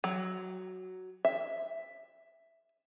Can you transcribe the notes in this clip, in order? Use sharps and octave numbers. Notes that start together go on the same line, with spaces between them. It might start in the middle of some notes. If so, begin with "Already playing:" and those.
F#3
E5